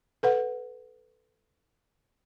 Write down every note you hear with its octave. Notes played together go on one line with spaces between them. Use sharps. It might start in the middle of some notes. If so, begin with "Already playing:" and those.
A4 B4 F#5